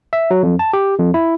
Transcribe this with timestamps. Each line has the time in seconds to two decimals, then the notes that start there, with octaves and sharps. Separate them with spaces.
0.13 E5
0.31 F#3
0.43 F2
0.59 A5
0.73 G4
0.99 F2
1.14 E4